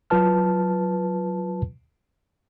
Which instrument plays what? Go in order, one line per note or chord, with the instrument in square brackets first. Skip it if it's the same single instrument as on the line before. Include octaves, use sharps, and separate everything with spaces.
[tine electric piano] F#3 F4 B4 A5 F6